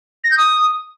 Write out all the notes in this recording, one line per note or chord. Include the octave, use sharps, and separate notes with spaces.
A#6
G6
D#6